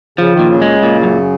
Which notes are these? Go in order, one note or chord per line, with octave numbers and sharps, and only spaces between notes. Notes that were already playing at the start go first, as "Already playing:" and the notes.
C#3 F3
D#3
A#2
C#3
G#3
A#2
F#2